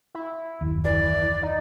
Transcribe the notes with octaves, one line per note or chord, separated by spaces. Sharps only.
E4
F#1 D#2
E3 D5
D#4